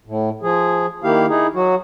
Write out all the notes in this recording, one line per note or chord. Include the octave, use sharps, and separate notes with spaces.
A2
F3 G#4
D#3 A#3 E4 G4 F5
D#4 E4 G#4
F#3 F#4